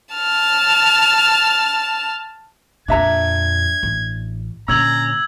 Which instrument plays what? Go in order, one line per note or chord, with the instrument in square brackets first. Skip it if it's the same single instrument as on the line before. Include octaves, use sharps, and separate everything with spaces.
[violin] A5 F6
[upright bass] F2 A#2 [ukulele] D4 E5 A#5 [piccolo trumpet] G#6
[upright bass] A1
[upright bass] A#2 D3 [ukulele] C#4 [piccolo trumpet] A#5 [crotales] E6 G#6 F#7